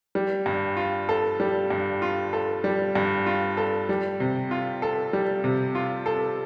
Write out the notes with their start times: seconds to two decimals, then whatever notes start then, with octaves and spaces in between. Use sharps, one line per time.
0.15 G3
0.46 G2
0.77 F4
1.09 A4
1.40 G3
1.70 G2
2.02 F4
2.33 A4
2.64 G3
2.95 G2
3.26 F4
3.57 A4
3.89 G3
4.20 C3
4.51 F4
4.82 A4
5.13 G3
5.44 C3
5.75 F4
6.06 A4